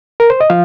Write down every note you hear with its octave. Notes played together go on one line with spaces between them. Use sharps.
A#4
C5
D#5
F3 F5